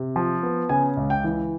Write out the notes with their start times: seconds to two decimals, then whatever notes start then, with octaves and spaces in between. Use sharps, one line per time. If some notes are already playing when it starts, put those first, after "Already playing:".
Already playing: C3
0.16 F3
0.43 B3
0.69 C#3 G#5
0.97 C#2
1.10 G5
1.24 E3